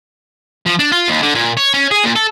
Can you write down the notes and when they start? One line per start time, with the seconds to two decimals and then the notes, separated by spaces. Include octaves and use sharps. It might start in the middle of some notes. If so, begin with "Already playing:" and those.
0.66 F3
0.79 D4
0.92 F4
1.08 D#2
1.22 D3
1.35 A#2
1.57 C#5
1.74 C#4
1.91 G#4
2.04 A#2
2.16 A4